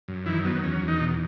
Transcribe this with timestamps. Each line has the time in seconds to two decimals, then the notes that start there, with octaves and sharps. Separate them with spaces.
0.08 F#2
0.26 D#3 E3 E4
0.45 F#3 B3
0.63 E2 C#4
0.82 E2
0.88 D#3 D#4
1.00 B2